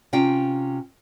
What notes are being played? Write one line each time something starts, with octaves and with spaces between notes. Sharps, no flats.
C3 C#4 F4 G5